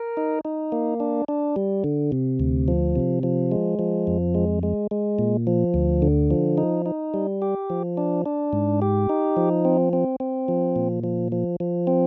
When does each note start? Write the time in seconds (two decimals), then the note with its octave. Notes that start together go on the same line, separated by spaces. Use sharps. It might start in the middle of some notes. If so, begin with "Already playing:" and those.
Already playing: A#4
0.17 D#4
0.45 D#4
0.72 A#3
1.00 D4
1.28 D4
1.56 G3
1.84 D3
2.12 C3
2.40 D2
2.68 F3
2.96 C3
3.23 F3
3.52 G#3
3.79 F3
4.07 F2
4.35 G#3
4.63 G#3
4.91 G#3
5.19 A#2
5.47 F3
5.74 D2
6.02 D3
6.31 F3
6.58 D#4
6.86 D#4
7.14 G3
7.42 G4
7.70 F3
7.97 D4
8.26 D4
8.53 G#2
8.82 G4
9.09 D#4
9.37 F3
9.65 C4
9.93 C4
10.20 C4
10.48 F3
10.76 A#2
11.04 F3
11.32 F3
11.60 F3
11.87 C4